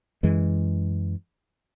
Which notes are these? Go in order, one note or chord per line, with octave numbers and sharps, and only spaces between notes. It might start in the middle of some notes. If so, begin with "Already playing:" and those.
F#2 E3 G#3